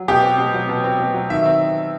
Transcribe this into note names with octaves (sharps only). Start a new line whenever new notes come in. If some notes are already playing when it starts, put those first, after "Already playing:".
Already playing: F#3
B2 G4
C4
B2
F#3
B2
C4
B2
F#3
D#3 E5
C4